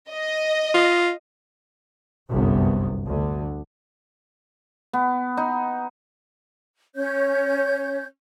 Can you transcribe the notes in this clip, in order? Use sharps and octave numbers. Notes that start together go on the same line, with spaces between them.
D#5
F4
G1 C2 F#2 B3
D2 D3
B3
D#4
C#4 C#5 G6